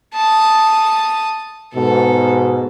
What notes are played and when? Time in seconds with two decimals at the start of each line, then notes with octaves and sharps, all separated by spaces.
0.14 A5 D#6
1.75 G#2 B2 A4